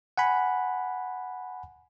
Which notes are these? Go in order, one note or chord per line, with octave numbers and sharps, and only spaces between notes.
F#5 G#5 B5